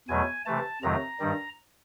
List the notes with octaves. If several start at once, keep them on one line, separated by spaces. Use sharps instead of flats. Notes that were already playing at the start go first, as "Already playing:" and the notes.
E2 B2 F#3 A3 G#5
C3 E3 A3 A5
F2 C3 D#3 F#3 A3 A#5
G2 D#3 G3